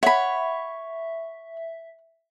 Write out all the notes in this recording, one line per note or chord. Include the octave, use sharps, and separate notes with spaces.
C#5 E5 F#5 B5